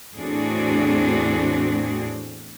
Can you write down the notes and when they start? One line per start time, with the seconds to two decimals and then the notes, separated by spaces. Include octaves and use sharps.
0.15 E2 A2 C4 D4 F#4 G#4